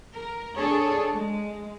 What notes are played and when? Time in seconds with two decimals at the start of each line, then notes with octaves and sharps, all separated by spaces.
0.13 A#4
0.54 D4 G#4 A4 C#5
1.12 G#3